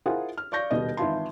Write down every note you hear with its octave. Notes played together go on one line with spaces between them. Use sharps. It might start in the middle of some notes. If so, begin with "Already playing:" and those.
E4 F4 G#4 A#4 C5 F#5
F6
D5 F5 C#6 G6 A#6
D#1 B2 D#5
G#1 E3 E4 F4 A5 C6